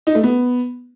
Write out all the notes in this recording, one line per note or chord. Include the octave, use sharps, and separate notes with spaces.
D#4
A3
B3